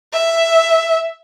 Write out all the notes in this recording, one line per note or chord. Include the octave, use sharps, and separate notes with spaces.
E5